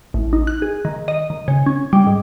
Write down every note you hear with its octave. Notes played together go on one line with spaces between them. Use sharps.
A1
D#4
F#6
G#4
D#3
D#5
D#3
C#3
C#4
G3
G#2